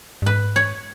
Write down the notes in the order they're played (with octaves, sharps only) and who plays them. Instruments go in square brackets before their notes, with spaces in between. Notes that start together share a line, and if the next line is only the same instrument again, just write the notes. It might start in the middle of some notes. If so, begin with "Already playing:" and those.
[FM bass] G2
[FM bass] G#2 [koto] B4
[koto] C#5